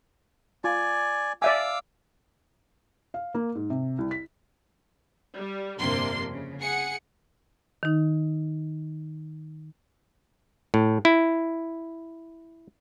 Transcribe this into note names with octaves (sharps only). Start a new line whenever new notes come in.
F4 D5 G#5
D5 E5 F5 G#5 D6 E6
F5
A#3
G#2
C3
C2
B6
G3
G1 F2 C3 A#3 D4 C6
C#3
G#4 F#5 C#7
D#3 D#4
A2
E4